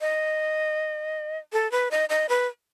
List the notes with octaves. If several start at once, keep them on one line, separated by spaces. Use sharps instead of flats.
D#5
A4
B4
D#5
D#5
B4